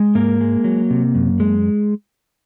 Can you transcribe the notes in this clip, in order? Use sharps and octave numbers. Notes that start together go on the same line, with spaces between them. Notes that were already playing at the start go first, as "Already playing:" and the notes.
Already playing: G#3
G#2 A#3 A#4
G#3
F#3
C3
F#2
G#3